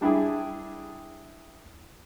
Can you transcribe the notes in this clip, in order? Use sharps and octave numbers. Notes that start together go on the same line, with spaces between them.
G3 D4 E4 G4 G#4